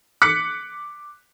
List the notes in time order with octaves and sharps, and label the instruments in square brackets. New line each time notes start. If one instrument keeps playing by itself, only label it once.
[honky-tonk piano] D6 F#6 B6 C#7